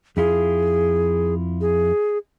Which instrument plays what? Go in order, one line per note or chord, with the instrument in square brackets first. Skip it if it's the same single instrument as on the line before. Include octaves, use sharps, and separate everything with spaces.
[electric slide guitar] F2 E4 F4 [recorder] G#4
[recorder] G#4